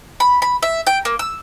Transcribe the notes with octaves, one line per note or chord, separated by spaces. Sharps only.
B5
B5
E5
G5
A#3
E6